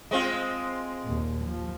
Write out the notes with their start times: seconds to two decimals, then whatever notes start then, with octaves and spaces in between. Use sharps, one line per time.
0.11 G#3 C4 F4
1.03 D#2 A#2
1.45 F3